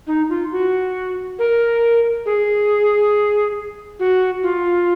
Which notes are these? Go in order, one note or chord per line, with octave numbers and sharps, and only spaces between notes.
D#4
F4
F#4
A#4
G#4
F#4
F4